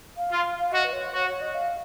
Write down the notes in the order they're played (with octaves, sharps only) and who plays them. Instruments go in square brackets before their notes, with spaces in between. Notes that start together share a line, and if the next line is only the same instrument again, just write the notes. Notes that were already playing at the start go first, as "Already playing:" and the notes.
[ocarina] F5
[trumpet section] F4
[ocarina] F5
F5
[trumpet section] F#4 [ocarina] D#5
[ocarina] B4
C#5
[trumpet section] F#4 [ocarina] C#5
[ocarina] C#5
D#5
F5